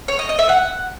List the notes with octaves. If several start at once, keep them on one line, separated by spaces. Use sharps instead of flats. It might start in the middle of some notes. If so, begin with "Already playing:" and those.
C#5
D#5
D#5
E5
F#5